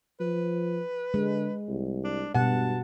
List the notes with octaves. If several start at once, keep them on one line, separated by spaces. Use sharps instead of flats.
F3 B4
D3 G#3
C2
D4
G2 B2 F#5 A5